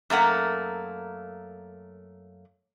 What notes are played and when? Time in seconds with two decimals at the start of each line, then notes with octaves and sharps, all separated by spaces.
0.10 F#2 A3 A#3 F#5